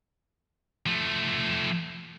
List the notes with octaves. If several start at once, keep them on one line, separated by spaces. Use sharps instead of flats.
F3 A3